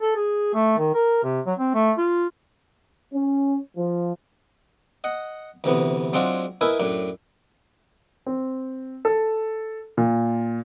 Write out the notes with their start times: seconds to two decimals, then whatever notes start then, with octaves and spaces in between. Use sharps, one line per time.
0.01 A4
0.16 G#4
0.54 A3
0.78 D#3
0.94 A#4
1.23 C3
1.46 F#3
1.59 C4
1.74 A3
1.98 F4
3.14 C#4
3.77 F3
5.04 D#5 F#5
5.64 D2 C3 E3 B3
6.13 F#3 G#3 C4 D4 F4 F#4
6.61 E4 A#4 B4 D#5 E5 G#5
6.80 F#2 A2 D4
8.26 C4
9.05 A4
9.97 A#2